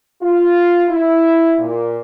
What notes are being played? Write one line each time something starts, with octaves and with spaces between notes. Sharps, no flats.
F4
E4
A#2